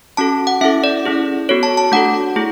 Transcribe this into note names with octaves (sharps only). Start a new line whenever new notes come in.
C#4 F#4 A4 A5
F#5
C#4 E4 A4 E5
D5
C#4 E4 G#4
B3 F#4 A4 C#5
A5
A5
A3 D4 F#4 A4 F#5
A3 E4 G#4